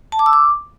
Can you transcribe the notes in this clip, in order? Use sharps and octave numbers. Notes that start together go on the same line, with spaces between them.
A5
D6
E6
D6